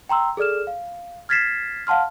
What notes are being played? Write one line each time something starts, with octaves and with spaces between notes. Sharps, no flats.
G5 A#5 C6 E6
G#4 A4 D5 F6 E7
F5
F6 G#6 A6 B6 C7 E7
F5 F#5 A5 C6 F6